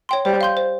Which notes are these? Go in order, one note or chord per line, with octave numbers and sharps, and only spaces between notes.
C#5 G5 C6
G3 C5
F5 C6 G6
C5